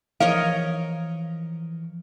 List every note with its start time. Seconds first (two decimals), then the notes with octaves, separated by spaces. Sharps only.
0.20 E3 F3 A#4 C#5 D#5 F5